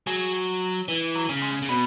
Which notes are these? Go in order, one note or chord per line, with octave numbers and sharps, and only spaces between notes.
F#3 G#4
E3
F#3
C#3
G#3
C#3
B2 B3